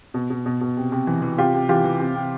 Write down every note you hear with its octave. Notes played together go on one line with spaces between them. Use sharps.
B2
B2
B2
B2
C3
C3
E3
E3
C3 F4 G4
C3
E3 F4 G4
E3
C3
C3